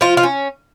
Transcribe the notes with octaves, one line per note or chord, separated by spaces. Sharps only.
F3 F4
F4
C#4